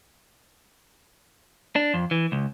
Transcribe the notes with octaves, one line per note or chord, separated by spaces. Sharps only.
D4
F2
E3
C#2